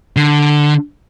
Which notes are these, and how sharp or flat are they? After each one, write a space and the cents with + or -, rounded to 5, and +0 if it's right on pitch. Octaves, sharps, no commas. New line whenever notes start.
D3 +5